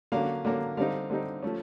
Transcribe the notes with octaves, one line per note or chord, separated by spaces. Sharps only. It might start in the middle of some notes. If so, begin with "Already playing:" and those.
D3 F#3 A#3 C#4 F5
D3 F#3 A#3 C#4
D3 G3 C4 D#4 F5
D3 G3 C4 D#4
F3 A3 C#4